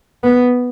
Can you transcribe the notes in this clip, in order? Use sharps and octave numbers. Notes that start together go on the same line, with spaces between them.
B3